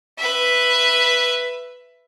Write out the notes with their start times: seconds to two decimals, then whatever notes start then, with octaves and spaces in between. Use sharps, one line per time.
0.18 B4 E5